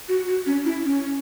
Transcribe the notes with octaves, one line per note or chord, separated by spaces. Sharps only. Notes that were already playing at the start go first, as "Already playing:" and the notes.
F#4
F#4
C#4
E4
C#4